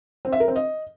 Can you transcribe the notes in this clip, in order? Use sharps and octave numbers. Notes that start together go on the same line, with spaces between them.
C4
E5
A#4
C4
D#5